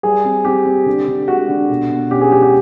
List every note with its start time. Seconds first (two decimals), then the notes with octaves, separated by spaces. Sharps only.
0.03 G3 G#4
0.25 C4
0.45 C4 G4
0.65 C4
0.86 D3
1.08 D3
1.28 G#3 F#4
1.49 D3
1.69 B2
1.90 B2
2.11 C#4 G4
2.21 G#4
2.32 G#3 G4
2.42 G4